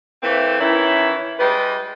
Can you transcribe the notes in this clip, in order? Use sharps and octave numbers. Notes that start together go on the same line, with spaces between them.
E3 A3 A#3 C4
D#3 E3 C#4 E4
G3 G#3 B4